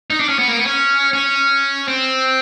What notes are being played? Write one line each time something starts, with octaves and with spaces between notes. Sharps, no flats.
D#4
D4
C#4
B3
A#3
B3
C#4
C#4
C4